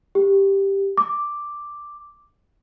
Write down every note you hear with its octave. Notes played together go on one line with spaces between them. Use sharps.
G4
D6